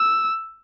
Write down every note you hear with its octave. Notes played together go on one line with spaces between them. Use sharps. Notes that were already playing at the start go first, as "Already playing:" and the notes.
Already playing: E6